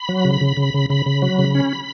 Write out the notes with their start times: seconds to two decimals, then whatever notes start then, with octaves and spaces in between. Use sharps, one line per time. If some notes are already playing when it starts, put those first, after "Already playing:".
Already playing: B5
0.09 F#3
0.25 C#3
0.41 C#3
0.57 C#3
0.74 C#3
0.90 C#3 B5
1.06 C#3
1.22 F#3
1.39 C#3
1.55 C#4